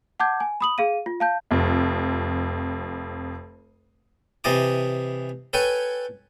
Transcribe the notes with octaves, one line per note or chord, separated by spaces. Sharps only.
F#5 A5 D6 G6 G#6
G#5
B5 D#6 F#7
G#4 F5 D#7
F4
F5 A5 G6
F1 F2
C3 E3 D#5 A5 D6
A4 B4 C#5 G5 G#5